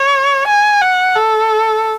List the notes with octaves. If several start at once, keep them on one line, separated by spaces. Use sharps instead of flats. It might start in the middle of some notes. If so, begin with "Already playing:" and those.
Already playing: C#5
G#5
F#5
A4